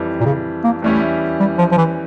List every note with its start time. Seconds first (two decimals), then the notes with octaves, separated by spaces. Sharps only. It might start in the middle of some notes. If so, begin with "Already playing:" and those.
Already playing: F2 E3 G3
0.21 A#2
0.26 C#3
0.64 A#3
0.82 E2 E3 G3 A3 C#4 E4
1.40 G3
1.58 F3
1.71 F3
1.78 E3